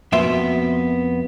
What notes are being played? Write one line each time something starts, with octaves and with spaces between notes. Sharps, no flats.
F2 B2 A#3 B3 E5 C6